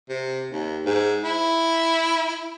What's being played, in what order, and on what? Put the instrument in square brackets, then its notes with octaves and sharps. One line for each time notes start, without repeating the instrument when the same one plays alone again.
[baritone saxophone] C3
D#2
G#2
E4